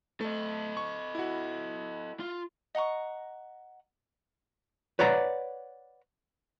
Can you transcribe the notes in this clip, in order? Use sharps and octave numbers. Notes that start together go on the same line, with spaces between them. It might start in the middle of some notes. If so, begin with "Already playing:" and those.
A3 A4 D#5
C#6
E4 F#4
F4
D#5 F#5 A#5 C#6
B4 C#5 D5 F#5 A#5